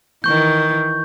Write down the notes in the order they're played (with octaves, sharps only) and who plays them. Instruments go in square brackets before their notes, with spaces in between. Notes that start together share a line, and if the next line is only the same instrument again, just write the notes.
[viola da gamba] D#3 E3 [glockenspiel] C#6 G6